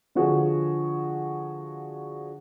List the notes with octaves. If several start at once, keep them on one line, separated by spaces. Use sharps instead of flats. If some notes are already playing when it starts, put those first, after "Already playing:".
D3 F3 F#4 G#4